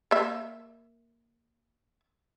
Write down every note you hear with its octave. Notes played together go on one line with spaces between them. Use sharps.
A#3 E5